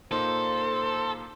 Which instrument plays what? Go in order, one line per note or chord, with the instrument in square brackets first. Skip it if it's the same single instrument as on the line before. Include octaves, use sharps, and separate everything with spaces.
[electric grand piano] A#2 A#3 D#4 [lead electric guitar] A4 [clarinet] C5 [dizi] C6